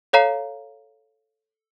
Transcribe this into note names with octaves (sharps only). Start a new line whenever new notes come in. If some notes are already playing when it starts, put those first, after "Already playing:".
A4 C#5 F5 A#5 C7